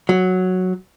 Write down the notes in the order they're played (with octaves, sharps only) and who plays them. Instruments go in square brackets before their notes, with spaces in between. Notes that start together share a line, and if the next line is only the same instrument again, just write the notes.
[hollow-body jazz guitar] F#3